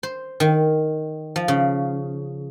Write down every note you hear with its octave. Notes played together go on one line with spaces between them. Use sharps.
C5
D#3
F3
C#3